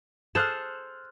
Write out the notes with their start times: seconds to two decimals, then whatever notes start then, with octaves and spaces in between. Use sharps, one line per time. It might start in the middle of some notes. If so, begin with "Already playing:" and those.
0.35 G#4 A4 C5 F6 F#6 E7